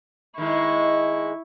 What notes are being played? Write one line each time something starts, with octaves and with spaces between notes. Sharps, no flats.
D#3 G#3 E4 C#6